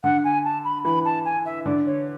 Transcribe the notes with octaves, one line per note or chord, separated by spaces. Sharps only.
D3 F#5
G#5
A5
B5
E3 B5
A5
G#5
E5
D3 D5
C#5